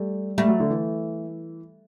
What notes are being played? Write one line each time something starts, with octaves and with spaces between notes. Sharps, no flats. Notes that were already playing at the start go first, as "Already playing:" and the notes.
Already playing: G3 A3
G3 A3
F#3
D3
E3